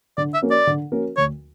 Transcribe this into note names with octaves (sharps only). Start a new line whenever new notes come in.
D3 D5
E5
A#3 C#4 F#4 A#4
D5
D3
A#3 C#4 F#4 A#4
D2 C#5